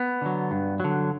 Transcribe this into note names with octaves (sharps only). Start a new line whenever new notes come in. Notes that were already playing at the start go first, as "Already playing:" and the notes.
Already playing: B3
D3 F#3
G2
D3 F#3